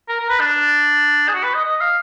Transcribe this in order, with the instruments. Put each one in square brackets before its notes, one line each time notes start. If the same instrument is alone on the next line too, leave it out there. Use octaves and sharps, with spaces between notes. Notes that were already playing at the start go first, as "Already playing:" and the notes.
[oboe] A#4
A#4
B4
D4
G#4
F#4
B4
D#5
D#5
F5